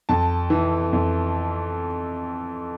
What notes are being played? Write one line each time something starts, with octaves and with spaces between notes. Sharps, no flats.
F2 A5
E3
F2